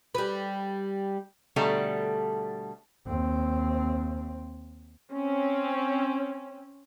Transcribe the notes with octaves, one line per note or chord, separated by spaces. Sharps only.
G3 B4
B2 D3 G3 A3 A4 A#5
D#2 C4
C4 C#4